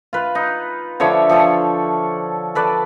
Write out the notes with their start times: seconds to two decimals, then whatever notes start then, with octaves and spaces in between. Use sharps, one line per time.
0.13 F4 B4
0.35 D#4
1.00 D3 F3 C#5 E5
1.29 F3 A4
2.55 A4 B4 D5